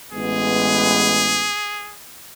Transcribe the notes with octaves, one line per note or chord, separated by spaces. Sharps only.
A1 G#3 B3 G#4